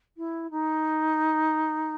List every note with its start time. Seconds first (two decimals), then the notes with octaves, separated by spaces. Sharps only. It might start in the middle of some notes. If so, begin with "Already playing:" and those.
0.17 E4
0.50 D#4